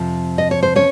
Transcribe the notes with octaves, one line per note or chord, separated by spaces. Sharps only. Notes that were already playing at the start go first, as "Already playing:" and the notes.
Already playing: F2 C3 F3
D#5
C#5
C5
C#4 C#5